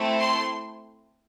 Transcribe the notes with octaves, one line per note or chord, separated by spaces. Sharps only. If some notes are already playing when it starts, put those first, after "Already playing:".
Already playing: A3 C4 E4 A4
C6